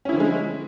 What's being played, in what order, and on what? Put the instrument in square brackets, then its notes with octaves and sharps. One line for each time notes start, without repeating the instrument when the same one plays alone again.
[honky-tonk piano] C#4
E4
D3
F3
G#3